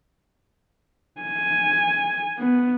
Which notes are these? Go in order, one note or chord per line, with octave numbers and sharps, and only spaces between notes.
G#5
B3